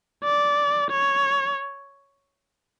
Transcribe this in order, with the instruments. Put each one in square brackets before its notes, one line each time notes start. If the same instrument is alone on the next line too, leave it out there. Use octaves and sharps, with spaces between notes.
[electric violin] D5
C#5